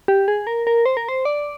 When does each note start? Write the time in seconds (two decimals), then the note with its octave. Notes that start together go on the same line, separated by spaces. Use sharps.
0.08 G4
0.28 G#4
0.47 A#4
0.67 A#4
0.86 C5
0.97 A#4
1.09 C5
1.25 D5